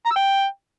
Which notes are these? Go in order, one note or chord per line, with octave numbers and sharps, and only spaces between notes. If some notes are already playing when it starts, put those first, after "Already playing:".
A#5
E6
G5